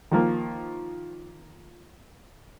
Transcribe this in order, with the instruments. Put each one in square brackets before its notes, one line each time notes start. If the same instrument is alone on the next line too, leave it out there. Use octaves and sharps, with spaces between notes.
[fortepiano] D#3 F3 A#3